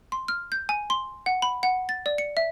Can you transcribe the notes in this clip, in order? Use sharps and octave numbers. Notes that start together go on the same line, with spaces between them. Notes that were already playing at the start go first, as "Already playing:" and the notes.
C6
F6
G6
G#5
C6
F#5
B5
F#5
A6
D5
C#7
E5